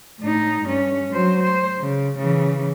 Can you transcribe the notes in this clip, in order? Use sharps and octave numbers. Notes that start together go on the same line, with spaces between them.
A2 D#4
G2 C#4
F#3 C5
C5
C#3
C#3 E3